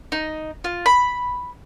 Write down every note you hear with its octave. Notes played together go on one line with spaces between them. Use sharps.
D#4
F4
B5